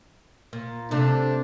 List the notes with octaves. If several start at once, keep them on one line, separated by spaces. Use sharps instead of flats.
A#2
C3 A3 D4